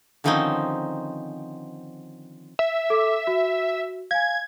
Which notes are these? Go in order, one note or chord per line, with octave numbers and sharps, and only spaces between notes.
D3 D#3 F3 C4 C#4 D#4
E5
A4 D6
F#4
F5 G#5 G#6